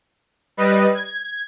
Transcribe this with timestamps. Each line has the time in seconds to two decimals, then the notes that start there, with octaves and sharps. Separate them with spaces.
0.57 G3 B4 D#5
0.94 G#6